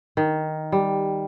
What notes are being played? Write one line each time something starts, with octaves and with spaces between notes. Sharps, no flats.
D#3
G3